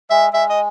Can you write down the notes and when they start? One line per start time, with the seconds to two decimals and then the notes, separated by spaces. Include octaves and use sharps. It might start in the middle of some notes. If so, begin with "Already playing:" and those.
0.10 G#3 E5
0.33 G#3 E5
0.49 D#5